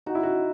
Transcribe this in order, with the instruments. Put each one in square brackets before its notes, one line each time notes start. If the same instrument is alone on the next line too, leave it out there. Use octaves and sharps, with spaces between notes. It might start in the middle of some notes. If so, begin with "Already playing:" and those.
[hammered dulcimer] D#4 [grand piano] F#4
[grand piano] E4
F#4